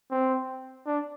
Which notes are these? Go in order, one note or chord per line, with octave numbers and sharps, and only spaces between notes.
C4
D4